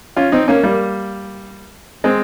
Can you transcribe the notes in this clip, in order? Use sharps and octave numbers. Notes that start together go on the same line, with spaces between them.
C#4 F4
C4 D#4
A#3 C#4
G3 A#3
G#3 C4